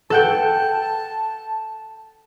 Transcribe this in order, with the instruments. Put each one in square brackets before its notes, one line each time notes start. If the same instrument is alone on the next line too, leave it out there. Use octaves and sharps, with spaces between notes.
[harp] A4 F#5 G5 [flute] A5